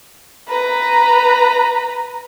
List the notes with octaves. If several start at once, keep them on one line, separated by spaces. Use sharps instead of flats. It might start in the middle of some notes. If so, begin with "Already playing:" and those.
B4 A#5